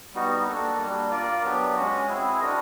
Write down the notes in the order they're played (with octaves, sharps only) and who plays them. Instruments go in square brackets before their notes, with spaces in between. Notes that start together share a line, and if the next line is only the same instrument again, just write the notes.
[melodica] G3 B3 D#4 F#4
A#3 D4 F#4 A4
G3 A#3 D4
F4 A#4 D5
F#3 B3 D4 G4
G#3 C#4 F#4
C4 E4 G#4
D4 F#4 A#4 D#5